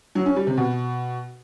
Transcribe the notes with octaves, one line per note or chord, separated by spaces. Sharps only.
F#3
C#4
G3
C3
B2